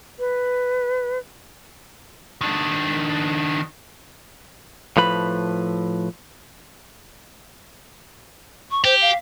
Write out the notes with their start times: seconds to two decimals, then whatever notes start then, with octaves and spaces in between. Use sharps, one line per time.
0.19 B4
2.41 D#3 D4
4.97 A2 F3 B4 B5
8.71 C#6
8.85 G4 C5
9.01 F5